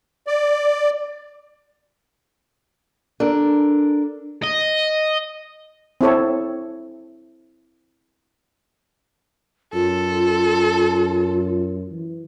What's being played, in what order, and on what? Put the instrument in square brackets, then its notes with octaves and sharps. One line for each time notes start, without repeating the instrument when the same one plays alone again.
[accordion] D5
[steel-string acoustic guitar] D4 A4 A#4
[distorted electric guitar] D#5
[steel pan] C4 E4 A4 C#5
[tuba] F#2 [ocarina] F4 [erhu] A4
[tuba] E3